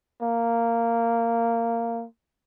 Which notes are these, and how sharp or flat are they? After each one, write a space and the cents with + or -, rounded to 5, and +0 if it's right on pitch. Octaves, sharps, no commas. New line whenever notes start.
A#3 -10